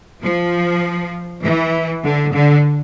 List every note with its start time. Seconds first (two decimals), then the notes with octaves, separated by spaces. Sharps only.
0.24 F3
1.44 E3
2.04 D3
2.34 D3